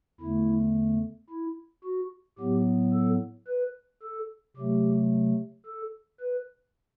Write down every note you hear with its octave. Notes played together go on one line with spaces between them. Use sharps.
E2 D3 A3 E4
E4
F#4
A2 F#3 B3 G4
A4
B4
A4
C3 F#3 A3 G4
A4
B4